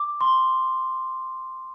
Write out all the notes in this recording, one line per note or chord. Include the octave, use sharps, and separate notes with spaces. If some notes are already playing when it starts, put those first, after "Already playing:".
Already playing: D6
C6